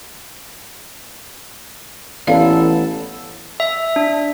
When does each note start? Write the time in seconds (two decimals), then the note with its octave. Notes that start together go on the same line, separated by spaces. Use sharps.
2.27 A1 E3 B3 A4 D5 F5
3.60 E5
3.96 D4